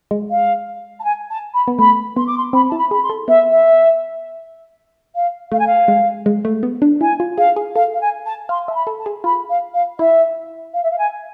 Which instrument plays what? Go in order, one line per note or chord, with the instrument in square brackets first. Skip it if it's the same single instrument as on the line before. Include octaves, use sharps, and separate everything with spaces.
[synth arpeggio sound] G#3
[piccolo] F5
A5
G#5
A5
B5
[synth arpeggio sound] B3
[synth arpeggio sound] A3 [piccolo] B5
[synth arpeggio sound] B3 [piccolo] C6
[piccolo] D6
C6
[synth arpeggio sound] C4 [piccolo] B5
[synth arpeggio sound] E4 [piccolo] A5
[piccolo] B5
[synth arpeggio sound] G#4 [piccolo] B5
[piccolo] C6
[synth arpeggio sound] A4
[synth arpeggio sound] B3 [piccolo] E5
[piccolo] E5
F5
[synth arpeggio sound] A3 [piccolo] F5
[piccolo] G#5
F5
[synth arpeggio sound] G#3
G#3
A3
B3
D4
[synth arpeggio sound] E4 [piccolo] G#5
[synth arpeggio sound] F4
[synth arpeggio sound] G#4 [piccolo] F5
[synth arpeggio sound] G#4
[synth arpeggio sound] A4 [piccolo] F5
[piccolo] F5
G#5
A5
[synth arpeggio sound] F5 [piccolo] C6
[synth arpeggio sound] E5 [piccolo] A5
[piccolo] B5
[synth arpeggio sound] A4
[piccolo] A5
[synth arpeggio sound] G#4
[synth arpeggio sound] F4 [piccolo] B5
[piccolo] F5
F5
[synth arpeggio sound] E4 [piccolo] E5
[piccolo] F5
E5
F5
G#5